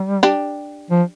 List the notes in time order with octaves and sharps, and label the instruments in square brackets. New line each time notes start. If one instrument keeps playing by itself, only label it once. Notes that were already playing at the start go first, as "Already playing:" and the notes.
Already playing: [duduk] G3
[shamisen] D4 G4
[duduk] F3